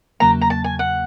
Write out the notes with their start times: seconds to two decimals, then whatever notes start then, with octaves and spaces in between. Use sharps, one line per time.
0.20 E2 C#3 F#3 A#3 A#5
0.41 A#5
0.50 A5
0.64 G#5
0.79 F#5